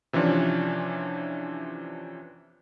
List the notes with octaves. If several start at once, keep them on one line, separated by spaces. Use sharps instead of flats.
C3 E3 F3 C#4 D4